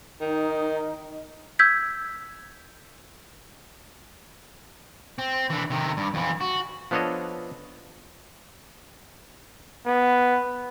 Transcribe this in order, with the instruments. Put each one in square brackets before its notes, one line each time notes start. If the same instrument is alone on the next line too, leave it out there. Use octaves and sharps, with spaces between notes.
[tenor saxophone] D#3 [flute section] D#4
[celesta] E6 G6 G#6 B6
[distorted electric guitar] C4
E3 D4
C3 D#3
G2
F2 E3
F#4
[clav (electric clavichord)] F3 B3 D4 A4 C#5 D#5
[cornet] B3